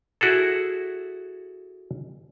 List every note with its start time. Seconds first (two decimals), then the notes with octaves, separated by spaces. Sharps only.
0.21 E4 F#4 G#4 A4